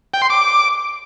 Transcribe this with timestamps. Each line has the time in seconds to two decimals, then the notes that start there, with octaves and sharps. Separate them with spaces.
0.14 G5
0.22 C6
0.30 D6